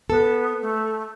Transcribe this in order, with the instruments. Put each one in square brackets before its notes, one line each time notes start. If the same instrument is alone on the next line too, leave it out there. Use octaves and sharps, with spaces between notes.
[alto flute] B3 [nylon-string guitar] A4
[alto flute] A3